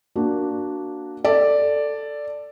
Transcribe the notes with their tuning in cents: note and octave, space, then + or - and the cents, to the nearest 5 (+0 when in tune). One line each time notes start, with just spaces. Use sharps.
A#3 +0 D4 +0 F#4 +0
A4 +10 D5 +0